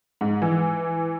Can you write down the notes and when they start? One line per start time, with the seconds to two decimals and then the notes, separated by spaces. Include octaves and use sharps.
0.21 G#2
0.42 E3